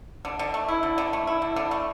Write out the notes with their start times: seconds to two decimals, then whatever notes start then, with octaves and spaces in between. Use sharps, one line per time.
0.25 D3
0.39 D3
0.54 A3
0.68 E4
0.83 D3
0.98 D3
1.13 A3
1.27 E4
1.42 D3
1.56 D3
1.71 A3